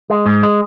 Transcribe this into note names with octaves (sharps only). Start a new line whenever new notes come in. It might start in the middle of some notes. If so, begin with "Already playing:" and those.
G#3
G#2
G#3